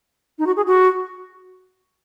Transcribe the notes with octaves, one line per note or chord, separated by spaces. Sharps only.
D#4
F#4
G#4
F#4